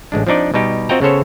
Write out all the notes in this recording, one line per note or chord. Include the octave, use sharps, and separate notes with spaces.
A1 G#3 D4
F3 C4 D4 D#4 D5
B2 G3 D#4 G4
C4 F4 F#4 D#5 G5 A#5
C#3 B3 C#4 A4 C5 C#5